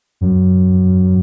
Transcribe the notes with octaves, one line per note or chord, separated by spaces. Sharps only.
F#2